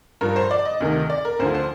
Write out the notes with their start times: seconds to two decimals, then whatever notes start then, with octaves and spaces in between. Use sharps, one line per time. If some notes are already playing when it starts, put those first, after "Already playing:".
0.21 G2 F3 A#4
0.36 C5
0.51 D5
0.65 D#5
0.80 D2 C3 D#3
1.10 D5
1.25 A#4
1.39 D2 D3 F3 C5
1.54 C5